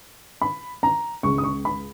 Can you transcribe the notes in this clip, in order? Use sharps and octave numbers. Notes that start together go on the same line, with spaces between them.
B5
A#5
C#2 C#3 G#3 C#6
D#6
C#6
B5